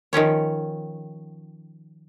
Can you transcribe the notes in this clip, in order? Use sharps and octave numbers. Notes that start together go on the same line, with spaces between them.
D#3 F3 C#4 C#5